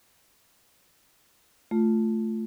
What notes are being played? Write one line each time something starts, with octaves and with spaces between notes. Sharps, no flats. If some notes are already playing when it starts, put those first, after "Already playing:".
A3 F4